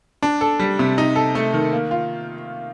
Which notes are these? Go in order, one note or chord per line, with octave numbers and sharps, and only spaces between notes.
D4
A4
G3
C3
D#4
A4
A3
D#3
A#3
F4